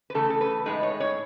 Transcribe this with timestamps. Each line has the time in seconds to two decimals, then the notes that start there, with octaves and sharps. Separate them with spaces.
0.10 B4
0.15 C#3 E3 A3 A4
0.30 A4
0.41 B4
0.66 A2 G#3 D#4 B4
0.83 C#5
1.00 C#5